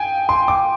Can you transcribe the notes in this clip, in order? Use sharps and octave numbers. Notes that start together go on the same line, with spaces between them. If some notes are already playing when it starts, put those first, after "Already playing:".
Already playing: G5 G#5
C6
D6